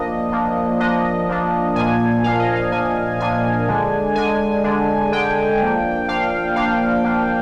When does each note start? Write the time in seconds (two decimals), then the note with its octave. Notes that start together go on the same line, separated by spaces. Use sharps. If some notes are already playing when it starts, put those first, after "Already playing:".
Already playing: F3 A#3 D4 D#5
0.32 F3 A#3 D4
0.80 F3 A#3 D4 D#5
1.29 F3 A#3 D4
1.76 A#2 F3 A#3 D4 G#5
2.24 A#2 F3 A#3 D4 F5
2.40 D#5
2.56 F5
2.72 A#2 F3 A#3 D4 G#5
3.20 A#2 F3 A#3 D4 G#5
3.68 D3 G#3 D4
4.15 D3 G#3 D4 G#5
4.64 D3 G#3 D4
5.12 D3 G#3 D4 G5
5.61 F3 A#3 D4
6.08 F3 A#3 D4 F5
6.56 F3 A#3 D4 F5
7.04 F3 A#3 D4